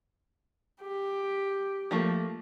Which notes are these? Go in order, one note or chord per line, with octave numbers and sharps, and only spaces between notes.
G4
F3 A3 A#3